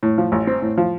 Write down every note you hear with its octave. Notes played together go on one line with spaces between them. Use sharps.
A2
F3
A1
C4
A2
F3